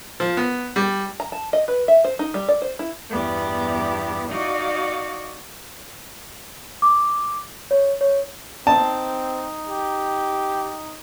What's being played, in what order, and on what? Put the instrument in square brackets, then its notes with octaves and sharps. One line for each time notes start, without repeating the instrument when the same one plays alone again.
[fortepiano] F3
B3
G3
[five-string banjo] A#5
A5
D#5
B4
E5
C5
D#4
G3
D5
C5
E4
[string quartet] E2 G2 B3 G4 D5
D#4 F#4 D5 D#5 F5
[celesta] D6
C#5
C#5
[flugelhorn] C4 [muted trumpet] D#4 [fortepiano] A5
[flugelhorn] G4